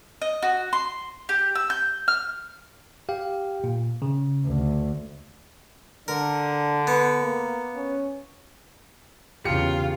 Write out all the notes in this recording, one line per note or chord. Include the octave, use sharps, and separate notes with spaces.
D#5
F#4
C6
G4
E6
G6
F6
G4 F5 G5
A#2
C#3
D2
D3 D4 A#4
B3
A#3
C#4
E2 C#3 F4 G4 C#7